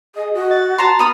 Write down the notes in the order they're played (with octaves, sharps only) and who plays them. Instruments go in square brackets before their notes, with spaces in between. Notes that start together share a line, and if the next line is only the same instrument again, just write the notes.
[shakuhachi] G#4 [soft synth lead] D#5
[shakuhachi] F#4 [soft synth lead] D#5
[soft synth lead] A6
[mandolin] A5 A#5 C6
[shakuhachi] B3 [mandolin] B5 D#6 F6